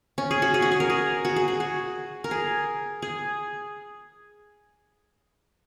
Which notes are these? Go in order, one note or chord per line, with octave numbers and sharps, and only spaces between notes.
C#4
G#4
F#4
G#4
F#4
G#4
A#4
G#4
F#4
G#4
G#4
F#4
A#4
G#4
G#4